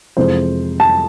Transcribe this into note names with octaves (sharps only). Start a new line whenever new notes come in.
F2 C3 E3 G#3 C5
A5